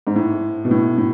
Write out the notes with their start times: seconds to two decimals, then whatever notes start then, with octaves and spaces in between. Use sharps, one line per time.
0.07 G#2
0.16 A2
0.65 B2
0.71 A2
0.98 A2